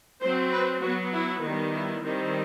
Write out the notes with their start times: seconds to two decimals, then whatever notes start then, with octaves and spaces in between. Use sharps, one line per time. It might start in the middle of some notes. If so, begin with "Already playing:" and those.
0.21 F#3 C4 C5
0.51 B4
0.81 F#3 B3 F#4
1.12 E4
1.41 D#3 G3 B3
1.72 E4
2.01 D#3 G3 C4